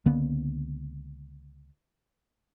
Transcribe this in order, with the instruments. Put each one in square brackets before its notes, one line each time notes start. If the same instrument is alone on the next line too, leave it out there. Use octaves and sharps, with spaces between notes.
[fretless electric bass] C#2 D3 A#3 B3